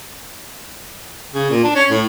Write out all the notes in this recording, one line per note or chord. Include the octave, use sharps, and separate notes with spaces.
C#3
A#2
D4
C#4
A2